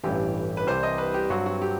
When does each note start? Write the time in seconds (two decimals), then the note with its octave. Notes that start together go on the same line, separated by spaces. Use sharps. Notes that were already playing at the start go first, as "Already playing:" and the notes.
0.04 A1 G2 E3 G4
0.57 B4
0.67 C2 C3 E3 G3 C5
0.83 D#5
0.98 B4
1.14 G4
1.30 G2 F#3 C4 F#4
1.46 F#4
1.62 G4